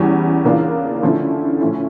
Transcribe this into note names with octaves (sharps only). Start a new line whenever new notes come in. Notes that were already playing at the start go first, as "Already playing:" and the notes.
Already playing: E2 E3 G3 C#4
C#3 E3 A#3 D4 F4
D3 F3 A3 C#4 E4
A2 F3 C#4 E4